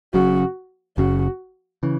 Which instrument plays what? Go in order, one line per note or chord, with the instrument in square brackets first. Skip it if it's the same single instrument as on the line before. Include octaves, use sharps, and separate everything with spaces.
[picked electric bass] F#1 F#2 C#3 [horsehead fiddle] F#4
[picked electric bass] F#1 F#2 C#3 [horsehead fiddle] F#4
[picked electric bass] C#3 E3